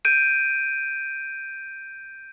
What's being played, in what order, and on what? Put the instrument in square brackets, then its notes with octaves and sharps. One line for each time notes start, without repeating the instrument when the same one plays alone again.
[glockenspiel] G6 D7 D#7